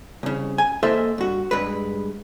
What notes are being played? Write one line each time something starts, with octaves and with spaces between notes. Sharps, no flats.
C2 C#3
G#5
A#3 E4 A4 C5 D#5 E5
G2 F#4
G2 G#3 B4